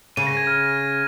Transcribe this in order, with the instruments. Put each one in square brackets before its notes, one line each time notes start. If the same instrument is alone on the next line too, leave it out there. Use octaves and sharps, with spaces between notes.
[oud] C#3 [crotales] D#7
[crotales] A#6
G#6
F6